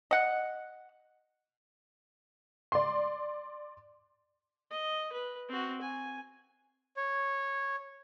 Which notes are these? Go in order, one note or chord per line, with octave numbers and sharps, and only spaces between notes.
D#5 F#5
D5 C6
D#5
B4
C4 F#4
G#5
C#5